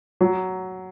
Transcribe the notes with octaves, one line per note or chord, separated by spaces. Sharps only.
F#3